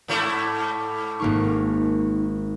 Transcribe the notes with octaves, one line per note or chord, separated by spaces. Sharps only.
G#2 A3 E4
G#1 A#3 D#4 C#6